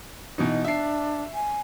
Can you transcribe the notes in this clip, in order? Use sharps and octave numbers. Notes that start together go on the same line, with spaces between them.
B2 E3 D#4
D4 E5 C7
G#5